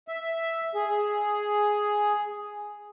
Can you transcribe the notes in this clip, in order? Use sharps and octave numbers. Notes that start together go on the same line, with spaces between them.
E5
G#4